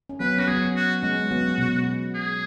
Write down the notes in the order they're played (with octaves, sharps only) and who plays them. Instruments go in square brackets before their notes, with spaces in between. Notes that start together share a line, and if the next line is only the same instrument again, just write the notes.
[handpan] C#4
[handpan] F#3 B3 [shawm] B4
[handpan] C#4 [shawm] F#4
[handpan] F#3 B3 [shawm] G#4
[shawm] F#4
[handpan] G#3 C#4 [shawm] F#4
[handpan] F#3 B3
B2
[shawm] G#4